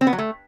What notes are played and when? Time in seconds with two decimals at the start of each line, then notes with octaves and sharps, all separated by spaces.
0.01 C4
0.07 B3
0.13 F#3
0.19 A3